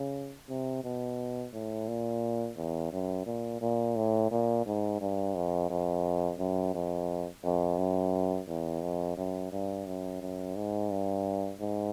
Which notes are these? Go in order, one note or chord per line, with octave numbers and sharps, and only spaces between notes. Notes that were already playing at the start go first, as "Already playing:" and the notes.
Already playing: C#3
C3
B2
A2
A#2
E2
F#2
A#2
A#2
A2
A#2
G#2
G2
F2
F2
F#2
F2
F2
F#2
E2
F2
F#2
G2
F#2
F#2
G#2
G2
G#2